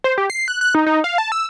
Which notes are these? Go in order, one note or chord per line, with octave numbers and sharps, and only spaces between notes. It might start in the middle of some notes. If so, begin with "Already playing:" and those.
C5
G4
C7
F#6
F#6
D#4
D#4
F5
A5
E6